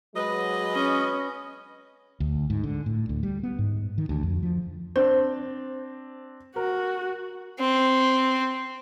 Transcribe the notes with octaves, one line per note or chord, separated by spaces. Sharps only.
F#3 G#3 B4 D#5
C#4
D2
G#2
D3
A2
D2
G3
B3
G#2
D#3
D2
F2
F3
C4 D4 C5
F#4 A#4
C4